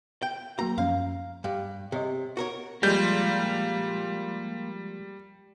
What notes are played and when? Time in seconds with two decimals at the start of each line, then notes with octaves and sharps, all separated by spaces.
0.22 G5
0.59 F#3 A#3 F#4 A#5
0.78 F#2 F3 C#4 F5
1.44 G2 G4 F5 G5
1.92 C3 G4 C#5 D#5
2.37 F#4 A#4 C#5
2.83 F3 G3 G#3 A#3 F4 G6